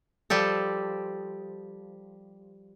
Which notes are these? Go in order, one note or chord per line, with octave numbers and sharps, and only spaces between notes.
F3 G3 G4 A4